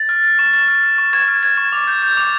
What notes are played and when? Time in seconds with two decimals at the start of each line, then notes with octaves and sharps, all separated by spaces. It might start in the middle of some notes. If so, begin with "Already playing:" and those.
Already playing: A6
0.09 F6
0.24 F6
0.39 C#6
0.53 C#6 A6
0.68 F6
0.83 F6
0.98 C#6
1.13 C#6 G#6
1.28 F6
1.43 F6 G#6
1.58 C#6
1.72 D6
1.87 G6
2.02 G6
2.17 D6